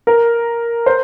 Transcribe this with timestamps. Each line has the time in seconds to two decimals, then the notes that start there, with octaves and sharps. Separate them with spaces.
0.07 A#4
0.86 C5